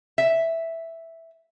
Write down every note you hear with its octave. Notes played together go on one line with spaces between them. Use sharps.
E5